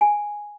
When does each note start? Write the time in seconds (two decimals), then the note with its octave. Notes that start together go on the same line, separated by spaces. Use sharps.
0.01 G#5